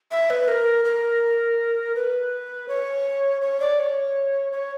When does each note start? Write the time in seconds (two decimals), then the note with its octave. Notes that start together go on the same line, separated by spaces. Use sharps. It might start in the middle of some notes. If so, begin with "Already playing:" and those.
0.11 E5
0.30 B4
0.48 A#4
0.84 A#4
1.95 B4
2.68 C#5
3.41 C#5
3.60 D5
3.79 C#5
4.52 C#5